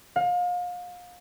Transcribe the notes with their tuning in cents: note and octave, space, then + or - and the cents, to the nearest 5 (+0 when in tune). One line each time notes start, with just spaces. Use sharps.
F5 +35